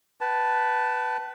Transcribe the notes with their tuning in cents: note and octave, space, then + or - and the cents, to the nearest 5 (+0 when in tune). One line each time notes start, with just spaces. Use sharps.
B4 +0 F#5 +45 A5 +0